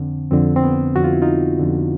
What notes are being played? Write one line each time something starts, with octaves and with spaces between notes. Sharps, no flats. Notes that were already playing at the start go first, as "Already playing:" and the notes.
Already playing: F2 D3 C4
F2 D3 C4
C4
B3
F2 D3 F#4
F4
E4
D#4 F4
F2 D3